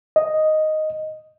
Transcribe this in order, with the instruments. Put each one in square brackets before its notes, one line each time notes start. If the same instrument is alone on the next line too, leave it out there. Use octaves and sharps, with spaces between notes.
[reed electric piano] D#5